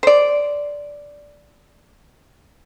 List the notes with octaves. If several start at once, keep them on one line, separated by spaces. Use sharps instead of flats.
C5 D5